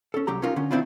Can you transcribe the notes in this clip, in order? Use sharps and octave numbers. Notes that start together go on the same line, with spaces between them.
C#4 A4
C2 F#3 G4 A#5
C#4 D#4 F4 A#4
D3 C#4
D#3 F3 C4 D4 E4 F4